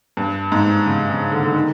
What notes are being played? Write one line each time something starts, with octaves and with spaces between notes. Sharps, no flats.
G2
G#2
C#3
C#3
D3
D3
D#3